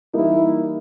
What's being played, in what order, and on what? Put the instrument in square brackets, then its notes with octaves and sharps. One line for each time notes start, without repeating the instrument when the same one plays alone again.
[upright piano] E3 G3 A#3 D#4 [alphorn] E4